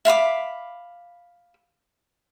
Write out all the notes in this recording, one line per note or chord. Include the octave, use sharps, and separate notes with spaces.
E5 F5 B5 D6